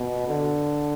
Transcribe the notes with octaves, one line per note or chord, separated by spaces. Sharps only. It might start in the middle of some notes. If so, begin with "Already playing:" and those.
Already playing: B2
D3